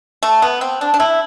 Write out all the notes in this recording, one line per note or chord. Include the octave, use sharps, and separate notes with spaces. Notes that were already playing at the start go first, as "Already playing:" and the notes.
A3
B3
C4
D4
D4
E4